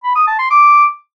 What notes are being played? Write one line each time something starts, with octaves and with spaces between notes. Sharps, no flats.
B5
D#6
A5
C6
D6